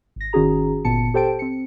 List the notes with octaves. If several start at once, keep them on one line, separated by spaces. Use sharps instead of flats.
G#1 A#6
G#1 D#3 C#4 F#4 G#4 A#5
G1 A#2 B3 A5 C#7
G4 A4 C5 G5 A5 D7
C4 C#7